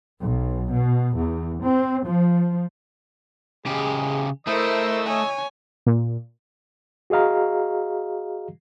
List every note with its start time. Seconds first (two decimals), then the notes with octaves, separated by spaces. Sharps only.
0.21 B1
0.73 B2
1.18 E2
1.64 C4
2.07 F3
3.66 C#3 G#3 G4
4.47 A3 E4 A#4 C5 D#5 D#6 E6
5.07 C#5 G#5
5.86 A#2
7.10 F#4 G#4 D#5 F5 A#5